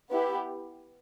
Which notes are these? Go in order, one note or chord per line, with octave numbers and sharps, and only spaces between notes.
B3 E4 G4